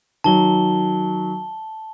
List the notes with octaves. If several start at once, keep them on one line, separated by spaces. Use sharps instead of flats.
D#3 F#3 A5 G7